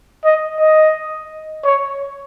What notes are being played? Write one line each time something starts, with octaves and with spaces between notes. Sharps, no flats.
D#5
D#5
C#5